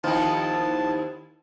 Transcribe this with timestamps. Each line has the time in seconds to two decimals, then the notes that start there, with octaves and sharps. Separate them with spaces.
0.04 D#2 F3 B3 C4 D#4 E4 C5 A5